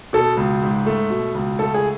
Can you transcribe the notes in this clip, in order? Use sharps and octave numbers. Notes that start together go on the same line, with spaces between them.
B2 A4
C#2
G#2
A3
B2
C#2
A3 A4
G#4